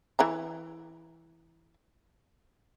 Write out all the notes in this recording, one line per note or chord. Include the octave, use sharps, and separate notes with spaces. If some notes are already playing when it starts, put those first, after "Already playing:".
E3 E5 A#5